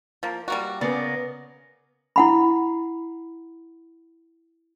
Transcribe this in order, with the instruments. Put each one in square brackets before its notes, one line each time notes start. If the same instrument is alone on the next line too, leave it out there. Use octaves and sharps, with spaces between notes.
[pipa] F3 A#3
G3 A#3 F#4
[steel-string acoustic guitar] C#3 B3 A#4 [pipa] D5
[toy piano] E4 F#5 B5